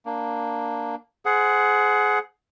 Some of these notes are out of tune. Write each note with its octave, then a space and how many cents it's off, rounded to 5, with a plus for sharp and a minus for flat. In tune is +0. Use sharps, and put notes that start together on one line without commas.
A#3 +0 D4 +0
G#4 +20 C5 -25 F#5 +0